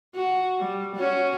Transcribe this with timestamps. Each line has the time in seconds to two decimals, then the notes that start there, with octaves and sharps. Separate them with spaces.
0.15 F#4
0.59 G3
0.96 C#4 F#4